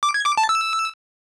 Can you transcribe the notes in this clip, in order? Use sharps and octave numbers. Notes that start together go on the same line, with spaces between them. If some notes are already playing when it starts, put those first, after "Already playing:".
D6
G#6
D6
A5
E6